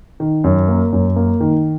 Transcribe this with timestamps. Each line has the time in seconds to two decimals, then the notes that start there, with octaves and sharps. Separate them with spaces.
0.20 D#3
0.44 F#2
0.68 A#3
0.93 F#2
1.16 A#3
1.40 D#3